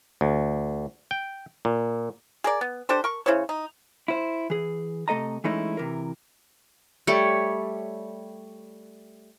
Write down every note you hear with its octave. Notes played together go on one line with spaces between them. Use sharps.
D2
G5
A#2
G#4 A#4 D5
B3
D4 G4 A4 C5
A#4 C#6
C#3 E4 C5 C#5
D#4
E4 C5
E3 G#4
C3 A3 A4 D#5 A#5
E3 G#3 A3 C#4 D#4 E4
C3 E3 A#4
G3 A3 C#5